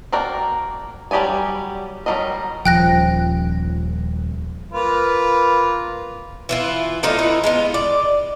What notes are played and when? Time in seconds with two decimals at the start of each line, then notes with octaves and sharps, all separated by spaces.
0.13 A#3 F#4 A#4 D5 G5
1.11 F#3 G3 G4 D5 G#5
2.06 F#3 G3 C4 A#4 D#5
2.65 D#1 F3 G5 F#6 A#6
4.73 A#3 F4 B4
6.49 E3 E4 F4
7.03 D3 A3 D#4 F4
7.19 E3 D#4 E4
7.44 G#3 B3 F4
7.74 D5